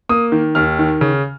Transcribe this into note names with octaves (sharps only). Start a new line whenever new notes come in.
A#3 D#6
D#3
D#2 F6
D#3
C#3